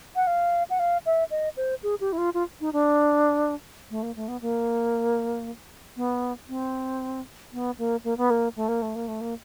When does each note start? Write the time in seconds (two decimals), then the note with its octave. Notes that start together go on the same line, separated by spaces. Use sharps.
0.16 F#5
0.27 F5
0.70 F#5
0.80 F5
1.06 E5
1.31 D#5
1.57 C5
1.83 G#4
2.01 G4
2.13 E4
2.18 F4
2.34 F4
2.61 D#4
2.73 D4
3.91 A3
4.03 A#3
4.16 A3
4.28 B3
4.41 A#3
5.97 B3
6.49 C4
7.53 B3
7.78 A#3
8.04 A#3
8.17 B3
8.30 A#3
8.56 A3
8.68 A#3
8.82 A3
8.96 A#3
9.08 A3
9.21 A#3